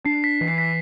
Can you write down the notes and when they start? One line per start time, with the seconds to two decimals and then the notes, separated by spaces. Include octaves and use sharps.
0.06 D4 C7
0.24 B6
0.41 E3
0.48 C7
0.58 B6